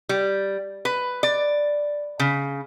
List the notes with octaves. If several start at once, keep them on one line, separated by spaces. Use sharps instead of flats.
G3
B4
D5
C#3